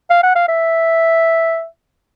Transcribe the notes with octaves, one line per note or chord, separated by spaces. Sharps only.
F5
F#5
F5
E5